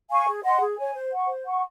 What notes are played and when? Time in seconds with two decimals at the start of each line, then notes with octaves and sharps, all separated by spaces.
0.10 F5 G#5 C#6
0.27 G#4
0.44 D#5 F#5 C6
0.60 G#4
0.78 C#5 G#5
0.95 C5
1.12 F#5 C#6
1.28 C5
1.45 F#5 C#6